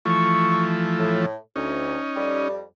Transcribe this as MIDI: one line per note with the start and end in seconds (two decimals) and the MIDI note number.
0.05 1.26 52
0.05 1.26 53
0.05 1.26 57
0.05 0.67 85
0.99 1.35 45
1.56 1.97 38
1.56 2.48 61
1.56 2.48 63
2.16 2.62 41
2.16 2.62 55